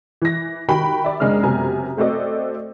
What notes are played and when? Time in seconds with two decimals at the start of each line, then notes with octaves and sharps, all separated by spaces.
0.22 E3 A#6
0.68 D#3 F#4 G4 G5 B5
1.04 D5 E5
1.20 F#1 G#3 D4 G#4 F6
1.43 F#1 F#2 C3 B3 G#5 A#5
1.97 A3 C4 F#4 A4 D5 D#5